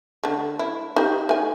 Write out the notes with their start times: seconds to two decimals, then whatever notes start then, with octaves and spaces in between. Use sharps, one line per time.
0.24 D3 A3
0.59 E4
0.96 D#4 G4
1.29 A3 G#5